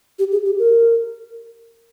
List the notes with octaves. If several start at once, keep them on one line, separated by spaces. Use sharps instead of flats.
G4
G#4
G4
A#4